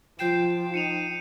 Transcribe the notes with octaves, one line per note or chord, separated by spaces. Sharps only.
F3 F4 G5 G6 C7 E7
D#4 C#7 D#7 F7